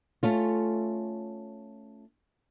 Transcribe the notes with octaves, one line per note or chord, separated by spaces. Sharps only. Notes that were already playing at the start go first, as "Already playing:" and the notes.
A3 C#4 F4